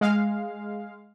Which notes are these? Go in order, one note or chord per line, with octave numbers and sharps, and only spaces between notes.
G#3 F5